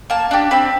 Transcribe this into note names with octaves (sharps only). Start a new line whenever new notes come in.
A#3 A5
D4 G4
C4 B5